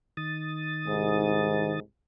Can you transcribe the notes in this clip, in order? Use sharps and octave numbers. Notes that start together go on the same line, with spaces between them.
D#3 D#6 A6
C2 G#2